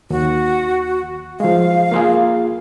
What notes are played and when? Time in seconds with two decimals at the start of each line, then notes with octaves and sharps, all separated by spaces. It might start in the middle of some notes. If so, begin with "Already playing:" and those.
0.10 D#2 F#4
1.40 F3 G#3 F5
1.92 A#3 F4 G#4